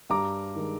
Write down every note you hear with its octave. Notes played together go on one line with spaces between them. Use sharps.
G2 A#5 D6
D#3 G#3